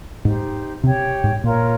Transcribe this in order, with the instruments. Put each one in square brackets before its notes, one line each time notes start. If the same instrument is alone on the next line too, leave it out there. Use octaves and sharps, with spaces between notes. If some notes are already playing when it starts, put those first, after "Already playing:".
[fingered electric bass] G#2 [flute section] D#4 G4 C5
[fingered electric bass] C3 [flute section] G4 C#5 G5
[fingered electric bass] G#2
[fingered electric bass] A#2 [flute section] F4 A#4 C#5